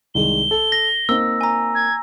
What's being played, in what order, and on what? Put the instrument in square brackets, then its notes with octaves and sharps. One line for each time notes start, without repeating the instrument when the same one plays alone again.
[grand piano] C2 D#3 G#3 [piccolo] G7
[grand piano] A4
[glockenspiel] A#6
[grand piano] A#3 C4 D#4 [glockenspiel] E6
[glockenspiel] G#5 A#5
[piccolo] G#6